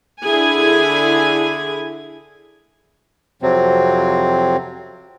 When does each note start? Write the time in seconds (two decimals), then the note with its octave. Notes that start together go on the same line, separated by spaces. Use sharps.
0.22 D3 E4 G#4 G#5
3.42 F2 C3 F#3 C4